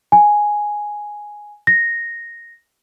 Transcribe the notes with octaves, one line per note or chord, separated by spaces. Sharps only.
G#5
A#6